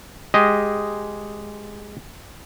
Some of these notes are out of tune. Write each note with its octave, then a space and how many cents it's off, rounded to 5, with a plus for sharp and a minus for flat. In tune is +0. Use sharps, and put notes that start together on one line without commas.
G#3 +0 G4 +0 D#5 +0